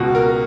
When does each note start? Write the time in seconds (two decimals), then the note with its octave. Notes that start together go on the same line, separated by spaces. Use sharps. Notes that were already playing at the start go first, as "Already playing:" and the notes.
Already playing: C#2 B2 F#4
0.15 A#4